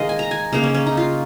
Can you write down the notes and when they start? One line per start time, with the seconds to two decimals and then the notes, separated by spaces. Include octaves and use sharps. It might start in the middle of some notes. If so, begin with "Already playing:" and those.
Already playing: D#3 G#3 D#5 F5
0.09 G#5
0.19 A#5
0.31 G#5
0.53 C#3 A#3 D#4
0.64 C#4
0.74 C#4
0.86 D#4
0.97 F4